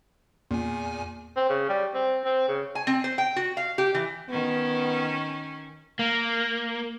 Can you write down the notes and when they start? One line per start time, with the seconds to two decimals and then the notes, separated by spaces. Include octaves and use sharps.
0.51 E2 A#2 G#5
1.37 C4
1.50 C#3
1.69 G3
1.94 C4
2.25 C4
2.48 C#3
2.75 G#5
2.87 C4
3.04 C5
3.18 G5
3.36 F#4
3.57 F5
3.78 G4
3.95 E3
4.29 D#3 B3 C#4
5.99 A#3